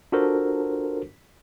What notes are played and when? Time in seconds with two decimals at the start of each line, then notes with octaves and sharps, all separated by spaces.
0.12 D4 F4 F#4 A4 A#4 C5